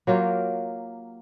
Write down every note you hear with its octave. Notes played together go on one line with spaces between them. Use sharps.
F#3 A#3 F4 G4